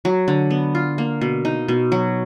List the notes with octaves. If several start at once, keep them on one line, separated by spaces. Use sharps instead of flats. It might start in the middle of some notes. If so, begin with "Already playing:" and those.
F#3
D3
B3
F4
A#3
B2
D#4
B2
F#3